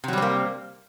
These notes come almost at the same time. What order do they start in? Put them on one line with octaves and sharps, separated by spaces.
C3 F#3 G3 C4 A#3